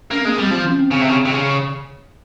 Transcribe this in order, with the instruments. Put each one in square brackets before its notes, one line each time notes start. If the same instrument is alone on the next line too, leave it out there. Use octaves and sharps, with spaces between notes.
[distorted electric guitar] A#3 [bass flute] C#4
[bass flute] C4
[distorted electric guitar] G#3 [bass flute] A#3
[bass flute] C4
[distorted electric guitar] G3
[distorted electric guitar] F3 [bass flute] C4
[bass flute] C#4
C4
[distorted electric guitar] C#3
C3
C#3
C3
C#3